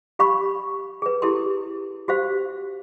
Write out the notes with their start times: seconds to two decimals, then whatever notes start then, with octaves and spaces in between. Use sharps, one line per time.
0.19 G4 F5 B5 C#6
1.02 G#4 B4
1.22 E4 G4 A4 C6
2.08 F#4 G4 C5 F5